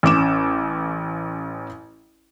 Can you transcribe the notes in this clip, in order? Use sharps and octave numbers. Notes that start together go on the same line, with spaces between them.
A1 C#4 D6 E7